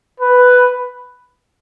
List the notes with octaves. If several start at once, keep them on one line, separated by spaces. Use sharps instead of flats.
B4